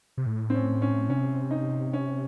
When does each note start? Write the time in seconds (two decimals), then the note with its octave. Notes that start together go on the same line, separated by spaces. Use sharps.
0.17 C3
0.26 A2
0.50 C4
0.54 C#4
0.82 C#4
1.09 C3 C#4
1.51 D#4
1.93 C#4